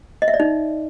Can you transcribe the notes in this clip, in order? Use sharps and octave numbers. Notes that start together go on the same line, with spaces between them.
D#5
E5
D5
D#4